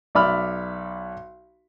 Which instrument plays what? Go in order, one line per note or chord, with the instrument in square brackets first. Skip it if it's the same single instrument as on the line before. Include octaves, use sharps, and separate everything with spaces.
[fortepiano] B1 D5 E5 B5 F6